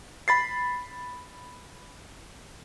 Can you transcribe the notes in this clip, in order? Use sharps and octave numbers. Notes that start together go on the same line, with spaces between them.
B5 A6 C7